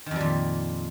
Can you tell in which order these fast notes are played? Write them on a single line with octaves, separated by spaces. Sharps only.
D#3 F2 G3 A#2